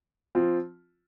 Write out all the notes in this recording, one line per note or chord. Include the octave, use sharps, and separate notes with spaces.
F3 C4 F4